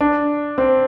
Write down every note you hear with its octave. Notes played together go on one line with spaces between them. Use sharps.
D4
C4